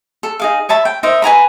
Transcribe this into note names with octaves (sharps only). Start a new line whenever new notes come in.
A4
D#4 G#4 F5
C#5 E5 A5 B5
G5
D#4 A#4 C5 E5
B4 G#5 A#5 B5